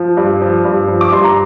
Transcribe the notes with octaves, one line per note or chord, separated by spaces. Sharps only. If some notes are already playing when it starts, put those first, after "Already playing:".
Already playing: F3
G2
F3
G2
F3
D6
G2 C6
A#5